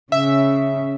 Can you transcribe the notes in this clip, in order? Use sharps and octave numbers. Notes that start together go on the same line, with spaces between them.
C#3 E5